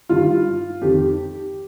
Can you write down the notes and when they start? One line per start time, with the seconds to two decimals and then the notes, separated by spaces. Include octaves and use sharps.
0.09 G2 D#3 F4
0.82 F2 D#3 G4